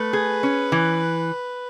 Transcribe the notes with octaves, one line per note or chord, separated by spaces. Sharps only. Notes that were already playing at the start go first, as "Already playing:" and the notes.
Already playing: A3 B4
G#4
C#4
E3